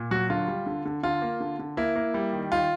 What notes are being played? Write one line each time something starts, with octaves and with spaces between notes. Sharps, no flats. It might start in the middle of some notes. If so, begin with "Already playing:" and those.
Already playing: A#2
F#3 F#4
D3 F4
G3
D3
D3
D3 F4
A#3
D3
D3
A#3 E4
A#3
G3
D#3
D#3 F4